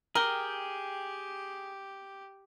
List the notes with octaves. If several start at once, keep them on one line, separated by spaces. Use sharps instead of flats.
G4 G#4 A#4 G5